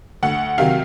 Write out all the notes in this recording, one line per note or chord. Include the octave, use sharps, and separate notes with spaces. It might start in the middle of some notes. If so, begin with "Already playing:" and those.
D2 F#5
C3 D#3 F#3 F5